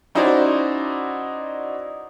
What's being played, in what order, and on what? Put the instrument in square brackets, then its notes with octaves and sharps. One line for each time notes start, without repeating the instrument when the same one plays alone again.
[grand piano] C#4 D#4 E4 F#4 C5 D5